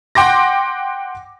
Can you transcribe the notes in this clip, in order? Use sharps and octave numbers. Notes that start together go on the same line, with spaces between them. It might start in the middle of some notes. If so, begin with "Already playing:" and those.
F#5 G5 C6 D6 A#6